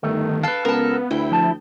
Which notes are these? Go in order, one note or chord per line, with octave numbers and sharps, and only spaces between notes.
G1 D#3 A3
A4 B4 F5 A5
C#2 B3 A4 A#4
D2 E4 G5
F3 A5